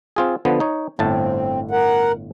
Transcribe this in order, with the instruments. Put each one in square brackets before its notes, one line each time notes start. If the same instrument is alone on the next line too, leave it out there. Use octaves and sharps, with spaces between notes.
[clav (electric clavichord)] C4 F4 G#4
D3 F3 B3
D#4 C#5
[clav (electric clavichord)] G1 A2 A5 [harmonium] C4
[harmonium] A#4 F#5